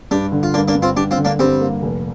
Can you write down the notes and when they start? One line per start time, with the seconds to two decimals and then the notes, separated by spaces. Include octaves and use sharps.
0.11 G2 D4 G4
0.32 D3
0.43 F4
0.54 G2 A#3 D4
0.68 A#3 D4
0.75 G2
0.82 C4 F4
0.96 G2 D4 G4
1.11 C4 F4
1.18 D3
1.25 A#3 D4
1.39 G2 G3 C4
1.61 A#3
1.83 F1